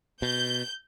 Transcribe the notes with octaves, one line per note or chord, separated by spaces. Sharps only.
B2 G6